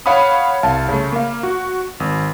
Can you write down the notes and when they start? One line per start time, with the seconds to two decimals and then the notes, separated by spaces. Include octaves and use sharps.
0.06 C#5 F5 F#5 B5 D#6
0.63 C2 F5 A5
0.89 C#3 A3
1.12 A#3 F5
1.43 F#4
2.00 G#1